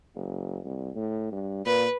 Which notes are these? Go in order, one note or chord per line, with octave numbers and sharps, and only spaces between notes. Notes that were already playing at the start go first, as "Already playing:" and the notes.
F#1
C2
A2
G2
A#2 B4